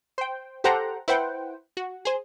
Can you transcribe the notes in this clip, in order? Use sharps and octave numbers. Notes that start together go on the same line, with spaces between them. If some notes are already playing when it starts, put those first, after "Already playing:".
C5 G5
G4 A4 C5 F#5 G5 A#5
E4 B4 C5 F#5 G5
F#4
G#4 C5